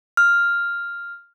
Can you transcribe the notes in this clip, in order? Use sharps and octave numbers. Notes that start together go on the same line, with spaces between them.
F6